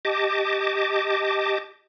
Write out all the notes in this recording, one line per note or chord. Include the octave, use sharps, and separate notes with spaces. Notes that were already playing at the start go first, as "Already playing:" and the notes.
G4 D#5 A5 D6